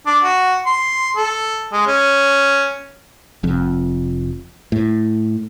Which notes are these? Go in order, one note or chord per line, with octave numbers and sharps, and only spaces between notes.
D4
F#4
C6
A4
G#3
C#4
F1 F2
A2